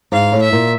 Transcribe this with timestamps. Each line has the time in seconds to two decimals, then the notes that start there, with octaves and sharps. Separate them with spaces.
0.12 G#2 F5
0.32 A2
0.42 E5
0.53 A#2